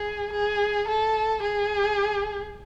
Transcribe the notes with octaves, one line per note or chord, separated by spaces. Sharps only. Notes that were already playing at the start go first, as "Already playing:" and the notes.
Already playing: G#4
G#4
A4
G#4